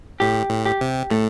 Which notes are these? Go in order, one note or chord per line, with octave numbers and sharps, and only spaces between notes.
A2 G4
A2
G4
C3
A2 A3